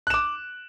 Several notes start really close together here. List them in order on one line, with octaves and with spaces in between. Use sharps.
F#6 E7 D6